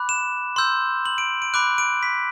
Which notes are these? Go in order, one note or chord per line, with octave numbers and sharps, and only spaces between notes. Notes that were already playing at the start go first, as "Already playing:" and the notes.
Already playing: B5 D6 F#6
E7
C6 E6 G6
F#7
D7
D7
B5 D6 F#6 D7
D7
B6